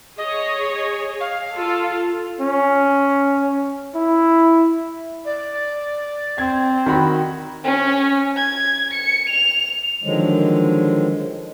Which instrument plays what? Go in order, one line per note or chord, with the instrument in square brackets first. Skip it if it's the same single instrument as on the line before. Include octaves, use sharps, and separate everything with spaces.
[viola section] G#4 C#5 [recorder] D#5
[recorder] F5
[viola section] F4 A4
[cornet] C#4
E4
[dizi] D5
[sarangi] C4 [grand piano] G#6
[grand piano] D#3 F#4 B5
[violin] C#4
G#6
C#7
F7
[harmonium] D3 D#3 F3 F#3 G#3